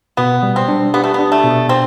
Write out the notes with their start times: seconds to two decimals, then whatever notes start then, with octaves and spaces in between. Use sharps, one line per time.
0.17 B2 B3
0.43 G3
0.56 C4
0.68 D4
0.94 B3 G4
1.04 A3
1.14 B3 D4
1.32 A3
1.44 B2
1.69 C4